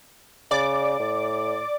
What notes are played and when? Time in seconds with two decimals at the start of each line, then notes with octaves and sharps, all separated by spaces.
0.51 C#3 D5 D6
1.00 A2